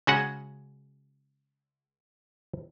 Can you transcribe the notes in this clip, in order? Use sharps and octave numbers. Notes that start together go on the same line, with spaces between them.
C#3 G#3 C#4 F#4 G#4 F#5